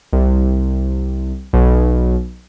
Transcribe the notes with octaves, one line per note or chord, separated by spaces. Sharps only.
C2
B1